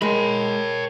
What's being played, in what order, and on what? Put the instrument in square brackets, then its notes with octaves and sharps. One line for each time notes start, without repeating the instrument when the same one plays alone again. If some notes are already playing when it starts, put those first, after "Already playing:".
[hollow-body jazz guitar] G#3 [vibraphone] A#4 G5 A5 [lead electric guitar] C#5 B5